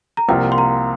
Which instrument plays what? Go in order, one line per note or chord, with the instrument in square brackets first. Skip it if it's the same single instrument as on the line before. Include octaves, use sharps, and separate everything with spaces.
[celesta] A#5
[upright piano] C2 C3 F3 A#3 F4 [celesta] G5
[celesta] C6
A#5